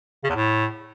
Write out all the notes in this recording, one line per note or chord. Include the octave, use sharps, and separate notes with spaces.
C#3
E2
A2